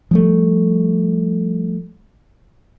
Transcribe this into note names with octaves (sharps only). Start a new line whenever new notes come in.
F3 G3 A3